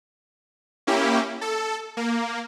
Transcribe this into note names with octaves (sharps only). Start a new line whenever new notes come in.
A#3 C#4 E4 G4
A4
A#3